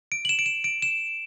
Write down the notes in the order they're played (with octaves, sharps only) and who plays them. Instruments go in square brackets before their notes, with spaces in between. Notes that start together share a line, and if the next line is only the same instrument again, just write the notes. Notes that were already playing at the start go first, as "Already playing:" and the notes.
[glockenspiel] D7
F#7
E7
D7
E7
D7
E7